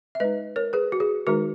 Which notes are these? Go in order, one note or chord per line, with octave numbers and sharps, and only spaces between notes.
E5
G#3 D#4 B4 D#5
A#4 C#5
G#4 B4
F#4
G#4
D#3 G#3 D#4 F#4 A#4